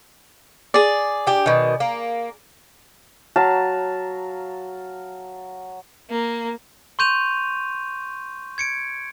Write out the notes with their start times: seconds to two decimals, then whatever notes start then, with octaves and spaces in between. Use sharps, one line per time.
0.74 G#4 D5
1.27 D4 G4
1.46 B2 D#3
1.80 A#3
3.36 F#3 F5 A5
6.10 A#3
6.99 C6 C#6 G6 D#7 F7
8.58 G#6 C#7 D7